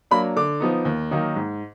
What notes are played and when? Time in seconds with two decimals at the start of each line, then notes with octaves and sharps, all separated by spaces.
0.11 F#3 A#3 D4 B5
0.36 D3 D6
0.60 F3 B3 D#4
0.85 D#2
1.11 D#3 F#3 A#3 D#4
1.36 G#2